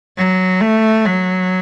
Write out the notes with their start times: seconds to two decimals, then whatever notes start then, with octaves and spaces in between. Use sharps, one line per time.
0.17 F#3
0.61 A3
1.06 F#3